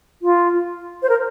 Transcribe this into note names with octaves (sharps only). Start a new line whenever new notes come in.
F4
C5
A#4